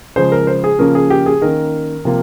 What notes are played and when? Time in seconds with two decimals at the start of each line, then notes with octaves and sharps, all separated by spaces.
0.16 C#3 F3 G#3 C5
0.32 A#4
0.47 C5
0.64 G#4
0.79 C#3 F3 A#3 C#4 A#4
0.95 G#4
1.10 G4
1.26 G#4
1.42 D#3 A#3 C#4 A#4
2.05 C3 F3 A#3 F4